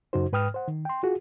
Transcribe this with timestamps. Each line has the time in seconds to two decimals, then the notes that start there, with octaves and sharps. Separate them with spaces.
0.13 F#2 C#3 D#4 F#4 C5
0.33 G#2 B4 G5 D#6 F6
0.54 C5 F#5
0.68 D#3
0.85 G5 C6
1.03 F4 F#4 G#4